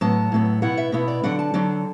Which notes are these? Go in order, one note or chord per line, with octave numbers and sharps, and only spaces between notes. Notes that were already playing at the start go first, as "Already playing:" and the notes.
A2 F#3 B3 A5
A2 F#3 B3
B2 B3 E4 F#5
E5
B2 B3 E4
D5
D3 F#3 D4 F#5
A5
D3 F#3 D4